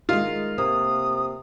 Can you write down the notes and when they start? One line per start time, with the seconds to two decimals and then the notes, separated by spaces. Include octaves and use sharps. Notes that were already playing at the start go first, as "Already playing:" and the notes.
0.09 D#3 G#3 F4
0.58 C3 A#3 D#6